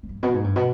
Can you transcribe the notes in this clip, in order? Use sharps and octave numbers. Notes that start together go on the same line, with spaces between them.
F2
G2
B2
G#2
G2
B2